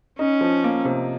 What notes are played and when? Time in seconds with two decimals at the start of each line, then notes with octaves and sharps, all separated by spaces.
0.19 C#4 D#4
0.41 F3
0.64 A#3
0.85 C3